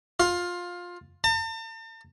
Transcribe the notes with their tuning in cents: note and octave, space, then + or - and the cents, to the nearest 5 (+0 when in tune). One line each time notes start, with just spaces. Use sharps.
F4 +15
A5 +45